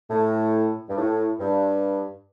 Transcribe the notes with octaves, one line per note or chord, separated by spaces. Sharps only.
A2
G2
A2
G2